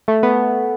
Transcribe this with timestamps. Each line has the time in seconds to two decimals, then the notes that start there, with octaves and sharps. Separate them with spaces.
0.08 A3
0.23 B3